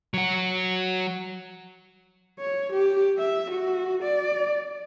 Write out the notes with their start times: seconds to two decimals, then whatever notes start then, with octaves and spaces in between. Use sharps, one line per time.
0.14 F#3 F#4
2.40 C#5
2.73 G4
3.18 E5
3.51 F#4
4.03 D5